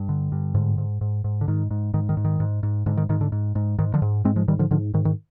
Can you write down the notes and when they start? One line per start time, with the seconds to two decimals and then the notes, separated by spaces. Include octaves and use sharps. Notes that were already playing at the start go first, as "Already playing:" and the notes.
Already playing: G2
0.09 D3
0.32 G2
0.55 G#2 D3
0.78 G#2
1.01 G#2
1.24 G#2
1.41 D3
1.48 G#2 D#3
1.71 G#2
1.94 G#2 D#3
2.09 D#3
2.17 G#2
2.25 D#3
2.40 G#2
2.63 G#2
2.86 G#2 D3
2.97 D#3
3.09 G#2 D#3
3.21 D3
3.32 G#2
3.55 G#2
3.79 G#2 D#3
3.94 D3 F3
4.02 G#2
4.24 G#2 G#3 C4
4.36 F3 G#3
4.48 G#2 D#3 G3
4.59 D3 F3
4.71 G#2 D3 F3
4.94 G#2 D#3
5.05 D#3